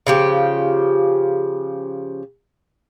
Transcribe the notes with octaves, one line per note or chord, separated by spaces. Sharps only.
C#3 F3 G4